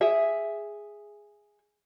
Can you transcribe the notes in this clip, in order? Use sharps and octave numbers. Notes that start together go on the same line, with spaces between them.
G#4 E5